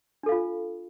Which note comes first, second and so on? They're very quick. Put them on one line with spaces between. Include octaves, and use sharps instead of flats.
D4 A4 F5 F4